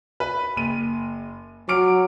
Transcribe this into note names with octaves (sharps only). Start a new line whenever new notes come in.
B4
F#1 D#7
F#3 D6 F6 D7